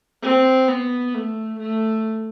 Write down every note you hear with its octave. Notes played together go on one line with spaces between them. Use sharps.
C4
B3
A3
A3